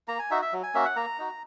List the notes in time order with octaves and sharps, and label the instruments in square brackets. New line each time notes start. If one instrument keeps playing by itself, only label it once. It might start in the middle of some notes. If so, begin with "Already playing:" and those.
[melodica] A#3 A#5
G#5
D#4 F#4 E5
E5
F#3
G#5
A#3 C#4 F#4 E5
F#5
A#3 A#5
D#4 F#4